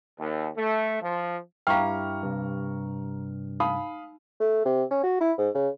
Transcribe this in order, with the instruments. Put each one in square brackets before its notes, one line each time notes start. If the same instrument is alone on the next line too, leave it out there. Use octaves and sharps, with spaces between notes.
[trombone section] D#2
A3
F3
[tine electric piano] G2 E4 G4 [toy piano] F5 G5 [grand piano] A#5 C#6 F6
[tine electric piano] G2 C3
[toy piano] D#4 [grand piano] F5 B5 D#6
[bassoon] A3
C3
C#4
F#4
E4
G#2
C#3